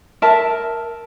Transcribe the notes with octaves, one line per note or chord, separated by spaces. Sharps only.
A#4 E5 A5